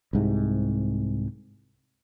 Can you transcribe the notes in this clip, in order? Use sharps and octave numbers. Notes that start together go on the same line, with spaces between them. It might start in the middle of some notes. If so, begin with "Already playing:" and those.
C2 G#2 C3